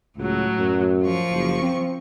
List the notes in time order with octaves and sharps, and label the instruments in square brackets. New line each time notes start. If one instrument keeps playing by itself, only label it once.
[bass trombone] C#2 [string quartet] A2 F#3
[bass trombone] F#2
[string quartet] F3 C#6
[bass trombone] F#1
C4